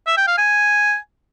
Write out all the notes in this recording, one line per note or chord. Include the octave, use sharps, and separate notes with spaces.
E5
G5
F5
G#5